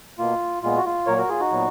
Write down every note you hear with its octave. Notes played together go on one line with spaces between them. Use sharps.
B2 A#3 F4
A#2 G#3 B3 F4
F#4
F4
A#2 F#3 A#3 A#4 C#5
F#4 A#4
F4 G#4
D#4 F#4
A#2 F#3 B3